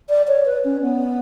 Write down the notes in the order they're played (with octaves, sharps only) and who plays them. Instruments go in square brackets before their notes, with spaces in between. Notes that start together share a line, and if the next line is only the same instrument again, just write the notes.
[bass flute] D5
C#5
B4
C#4
B3